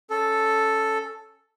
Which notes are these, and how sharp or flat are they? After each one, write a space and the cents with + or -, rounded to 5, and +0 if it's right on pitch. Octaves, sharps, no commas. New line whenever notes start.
C#4 +0 A4 +0